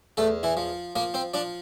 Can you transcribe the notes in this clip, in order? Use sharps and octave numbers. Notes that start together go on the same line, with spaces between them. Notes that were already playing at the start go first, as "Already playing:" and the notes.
E2 A3 A4
E3 E4
F3
F3 A#3 A#4
C4 C5
F3 D4 D5